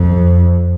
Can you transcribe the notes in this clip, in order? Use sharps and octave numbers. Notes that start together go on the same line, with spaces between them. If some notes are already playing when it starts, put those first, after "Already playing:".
Already playing: F2